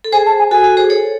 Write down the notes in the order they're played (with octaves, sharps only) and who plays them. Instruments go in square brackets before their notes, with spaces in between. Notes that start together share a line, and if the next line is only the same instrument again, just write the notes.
[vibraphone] A4
[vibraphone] G#4 C5 [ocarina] G#5
[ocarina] A5
G#5
[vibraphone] F#4 A4 [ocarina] G#5
[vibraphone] F#4 A4
G#4 C5
A4 C#5